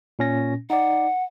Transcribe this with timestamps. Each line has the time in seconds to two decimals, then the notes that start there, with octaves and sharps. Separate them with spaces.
0.19 A#2 C#4 A#6
0.70 D#4 D5 F#5